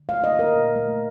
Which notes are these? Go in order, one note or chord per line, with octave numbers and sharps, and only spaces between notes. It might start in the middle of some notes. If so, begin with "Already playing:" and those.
Already playing: D3
A3 F5
D#5
D3
A#4
A#2
A3